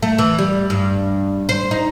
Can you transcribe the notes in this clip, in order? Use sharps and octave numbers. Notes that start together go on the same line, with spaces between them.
A3
E3
G3
G2
C5
D#4